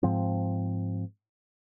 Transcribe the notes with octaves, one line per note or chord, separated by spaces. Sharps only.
G#2 F3 C4